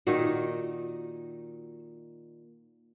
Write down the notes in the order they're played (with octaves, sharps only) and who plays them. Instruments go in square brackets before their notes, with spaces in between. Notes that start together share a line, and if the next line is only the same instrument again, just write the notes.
[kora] A#2 D#3 D#4 [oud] F#4